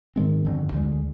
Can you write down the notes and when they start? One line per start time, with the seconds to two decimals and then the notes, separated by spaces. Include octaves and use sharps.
0.16 G#2 D#3 G#3 C4
0.45 G1 F2 D3
0.72 D2 D3 G#3